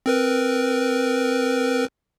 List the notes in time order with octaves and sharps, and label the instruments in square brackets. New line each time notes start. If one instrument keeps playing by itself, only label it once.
[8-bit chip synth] C4 A#4 B4